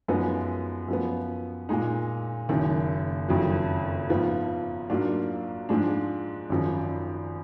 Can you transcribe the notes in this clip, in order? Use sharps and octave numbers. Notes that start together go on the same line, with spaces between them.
F#2 F3 G#3 B3 D#4
F#2 F3 B3
A#2 G#3 D#4
F#1 F#2 D#3
F#1 F2 D#3 F#3
G#2 F3 B3 F4
G#2 F#3 A#3 D4 F4
G#2 F3 G#3 D4
G#1 F#2 F3